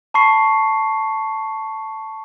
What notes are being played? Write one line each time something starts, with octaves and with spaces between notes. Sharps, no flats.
A5 B5 C#6 C7